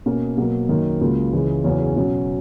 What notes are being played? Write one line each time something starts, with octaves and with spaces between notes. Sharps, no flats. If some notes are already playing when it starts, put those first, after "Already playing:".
B2 A#3 C#4
B2 F#3 A#3
F#2 D#3 A#3
C#2 C#3 F#3 A#3
C#2 C#3 E3 G#3
E2 C#3 F#3 C#4
B2 F#3 C#4